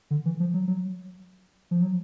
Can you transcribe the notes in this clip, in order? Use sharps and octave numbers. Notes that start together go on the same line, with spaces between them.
D3
E3
F3
F#3
F#3
F3
F#3